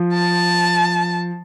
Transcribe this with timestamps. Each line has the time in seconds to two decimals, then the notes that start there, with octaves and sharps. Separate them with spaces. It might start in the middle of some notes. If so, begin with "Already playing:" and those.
Already playing: F3
0.13 A5